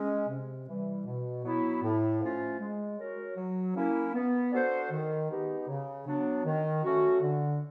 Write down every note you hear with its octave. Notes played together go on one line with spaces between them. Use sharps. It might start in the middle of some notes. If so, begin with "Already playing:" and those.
Already playing: G#3 C#4
C3
E3 G3
B2
F#3 B3 E4
A2
F3 A3 C#4 F4
G#3
C#4 F#4 A#4 C#5
F#3
A#3 C#4 E4
B3
D4 F#4 A4 C5
D#3
G#3 B3 D#4 G4
C#3
F#3 B3 D4
D#3
F#3 A3 C#4 F#4
D3